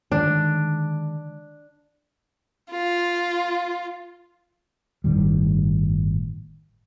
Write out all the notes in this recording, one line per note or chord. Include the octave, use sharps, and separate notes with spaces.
D3 D#3 G#3 D4
F4
G1 A2 D#3 G3